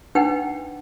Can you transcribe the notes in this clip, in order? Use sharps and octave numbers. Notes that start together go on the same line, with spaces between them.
D4 D#4 B4 F#5 G5